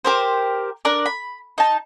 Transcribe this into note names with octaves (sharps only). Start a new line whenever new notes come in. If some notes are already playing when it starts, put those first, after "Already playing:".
G4 A#4 C5
D4 A#4 D5
B5
D#4 A5